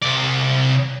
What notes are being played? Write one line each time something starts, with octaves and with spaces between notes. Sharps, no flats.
C3 D5